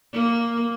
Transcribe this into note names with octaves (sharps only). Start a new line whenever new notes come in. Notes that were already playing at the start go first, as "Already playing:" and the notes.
A#3